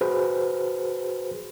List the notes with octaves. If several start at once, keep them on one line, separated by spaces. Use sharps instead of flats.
F#4 G#4 B4 C5